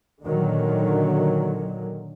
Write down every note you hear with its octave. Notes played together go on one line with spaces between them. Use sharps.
A#2 D3 D#3 F#3